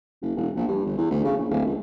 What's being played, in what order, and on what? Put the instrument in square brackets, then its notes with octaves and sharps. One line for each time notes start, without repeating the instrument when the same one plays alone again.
[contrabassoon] F#1
E1
A#1
G2
G1
E2
D2
C#3
A#1
D1
C#2